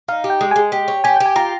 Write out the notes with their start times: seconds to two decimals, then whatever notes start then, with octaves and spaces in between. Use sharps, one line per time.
0.08 D#4 F5
0.24 G4
0.30 G5
0.41 G#3
0.51 G#3 G#5
0.72 G4
0.88 C#5
1.04 G4 G#5
1.16 G4 G5
1.26 G#5
1.36 F4 A#5